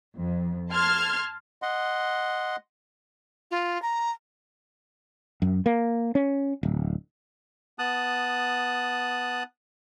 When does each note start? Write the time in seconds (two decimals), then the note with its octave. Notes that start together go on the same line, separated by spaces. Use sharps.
0.16 F2
0.71 A5 C6 F6 G#6
1.62 D#5 F#5 C6
3.51 F4
3.82 A#5
5.42 F#2
5.66 A#3
6.15 C#4
6.63 D1
7.79 B3 A5 D#6 F#6